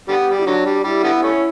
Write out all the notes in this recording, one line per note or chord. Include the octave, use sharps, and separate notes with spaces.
D3 G3 B3 G4
G3
E4
D3 F#3 D4
G3
G3 E4
D3 G3 B3
A3 C#4